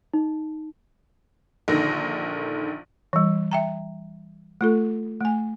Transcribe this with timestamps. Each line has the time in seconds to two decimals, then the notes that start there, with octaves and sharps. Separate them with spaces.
0.13 D#4
1.68 A#1 D3 D#3 A#6
3.13 E3 G3
3.51 E5 G5 A#5
4.61 A3 F4 A4
5.20 A3 G#5